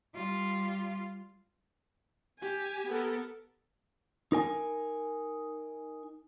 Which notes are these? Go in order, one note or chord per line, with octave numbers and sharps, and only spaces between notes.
G3 F4
G4 G#5
B3 A4 A#4
D#4 A#4 G#5